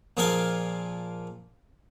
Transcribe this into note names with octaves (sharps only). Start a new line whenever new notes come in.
A#2 F3 G#4 A#4 F5